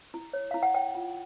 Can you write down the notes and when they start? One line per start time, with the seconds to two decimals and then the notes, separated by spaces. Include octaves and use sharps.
0.14 E4
0.33 C#5
0.51 E4 F5
0.63 F#5
0.74 C#5 G5
0.95 F4